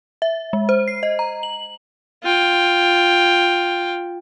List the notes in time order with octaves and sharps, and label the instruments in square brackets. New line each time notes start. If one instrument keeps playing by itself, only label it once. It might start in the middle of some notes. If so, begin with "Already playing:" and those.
[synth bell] E5
G#3
C5
C7
D#5
A#5
F#7
[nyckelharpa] F4 G5